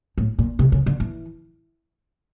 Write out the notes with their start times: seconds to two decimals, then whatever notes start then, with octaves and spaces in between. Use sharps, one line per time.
0.18 A2
0.39 A#2
0.59 C3
0.72 C#3
0.86 D3
1.00 E3